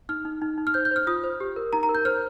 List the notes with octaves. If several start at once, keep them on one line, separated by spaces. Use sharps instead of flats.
D#4 F6
D#4
D#4
D#4
F6
C5 G6
G6
C5 F6
F4 D#6
C5
G4
A#4
D#4 A#5
A#5
A#4
G6
C5 F6